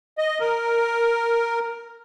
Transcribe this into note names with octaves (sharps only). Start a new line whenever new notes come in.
D#5
A#4